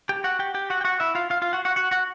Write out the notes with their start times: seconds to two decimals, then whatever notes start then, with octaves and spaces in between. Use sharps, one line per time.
0.09 G4 G5
0.24 F#4 F#5
0.39 G4 G5
0.54 G4 G5
0.70 F#4 F#5
0.81 G5
0.85 F#4 F#5
1.00 E4 E5
1.15 F4 F5
1.30 F4 F5
1.42 F4 F5
1.53 F#4 F#5
1.65 F#4 F#5
1.76 F#4 F#5
1.91 F#4 F#5